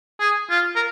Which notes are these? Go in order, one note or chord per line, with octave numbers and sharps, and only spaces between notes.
G#4
F4
A#4